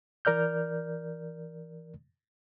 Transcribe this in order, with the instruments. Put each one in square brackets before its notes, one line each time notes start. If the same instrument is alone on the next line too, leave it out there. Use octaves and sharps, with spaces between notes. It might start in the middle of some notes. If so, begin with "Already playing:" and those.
[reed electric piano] E3 A#4 D5 F6 G6